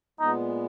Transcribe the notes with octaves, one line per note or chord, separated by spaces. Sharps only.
A#2 G#3 B3 D#4